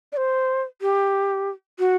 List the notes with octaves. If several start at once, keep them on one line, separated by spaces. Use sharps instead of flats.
D5
C5
G4
F#4